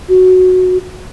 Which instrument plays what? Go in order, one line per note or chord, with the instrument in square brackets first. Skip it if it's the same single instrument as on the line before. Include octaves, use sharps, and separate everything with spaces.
[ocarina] F#4